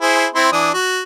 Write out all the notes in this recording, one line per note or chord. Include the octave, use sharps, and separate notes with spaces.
E4 G#4 C5
C4 E4 C6
E3 D4 D#6
F#4